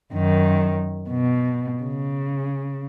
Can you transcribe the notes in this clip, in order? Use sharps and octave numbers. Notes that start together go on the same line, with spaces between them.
F#2 D#3
B2
C#3